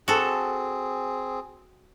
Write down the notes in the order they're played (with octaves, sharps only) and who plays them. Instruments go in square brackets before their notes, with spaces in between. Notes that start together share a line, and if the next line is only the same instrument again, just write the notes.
[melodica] C4 G#4 [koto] F#4 A4